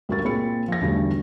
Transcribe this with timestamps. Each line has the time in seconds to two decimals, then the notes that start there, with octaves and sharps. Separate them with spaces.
0.09 C#2 G2 F#4 A#4 C#6 A6
0.24 A#2 C4 G#4 B5 C#7
0.68 F3 A#6
0.81 B1 E2 G2 D3 G3 A3